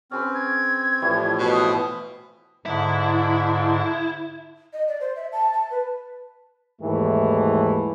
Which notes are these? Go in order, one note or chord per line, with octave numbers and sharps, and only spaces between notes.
C4 C#4 G#4 B4 F6
G#6
A2 E3 F3 G3 E4 C#5
B2
C4 E4 D#6
G#2 D3 E4
D#5
D5
C5
E5
A5
A5
B4
D#2 G#2 E3 A3